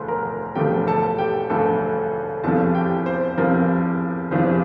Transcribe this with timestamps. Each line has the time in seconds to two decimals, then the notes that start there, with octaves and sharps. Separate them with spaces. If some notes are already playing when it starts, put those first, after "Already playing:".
Already playing: E1 D2 F3 A3 C6
0.08 A#4 A#5
0.55 E1 D2 D3 F3 A3 G4 G5
0.87 A4 A5
1.18 G4 G5
1.50 E1 D2 D3 F3 A3 A4 A5
2.44 F1 E2 C3 F3 A4 A5
2.75 G4 G5
3.06 C5
3.37 F1 E2 C3 F3 A#4
4.31 F1 E2 C3 F3 C5